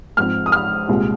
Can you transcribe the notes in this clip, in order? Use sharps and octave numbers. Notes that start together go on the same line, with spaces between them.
G#2 F3 C4 F6
D#6
F6
C2 A#2 G#3